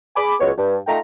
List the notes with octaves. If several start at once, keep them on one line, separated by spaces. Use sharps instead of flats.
G#4 G#5 B5 D6
C#2 F#3 G#3 B3 C#5
G2
A3 D#4 F4 G5 A#5